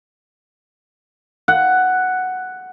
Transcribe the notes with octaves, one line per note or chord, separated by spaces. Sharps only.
F#5